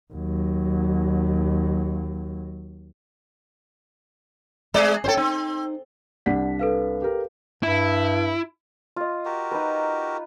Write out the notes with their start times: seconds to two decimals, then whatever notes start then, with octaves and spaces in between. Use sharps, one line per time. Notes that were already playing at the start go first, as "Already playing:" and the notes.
0.13 D#2 F#3
4.74 G#3 C4 G#4 D5
5.04 C#4 A4 C5 C#5 G5
5.17 C4 D#4
6.26 C2 D4 D5 F#5 B6
6.59 A4 B4 F5
7.02 G4 A#4
7.63 G2 E4
8.96 F4 D#5
9.25 F#4 G4 A#4
9.52 D#4 B4